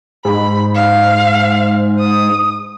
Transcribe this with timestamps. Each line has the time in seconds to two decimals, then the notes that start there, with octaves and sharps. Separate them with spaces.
0.25 G#2 B5
0.75 F5
1.99 D#6